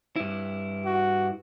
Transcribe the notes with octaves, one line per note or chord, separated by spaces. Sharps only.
G2 E4
F#4